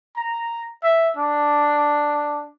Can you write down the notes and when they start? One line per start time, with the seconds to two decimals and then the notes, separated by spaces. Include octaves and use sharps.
0.16 A#5
0.83 E5
1.17 D4